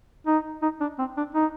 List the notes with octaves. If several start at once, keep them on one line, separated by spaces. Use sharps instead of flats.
D#4
D#4
D4
C4
D4
D#4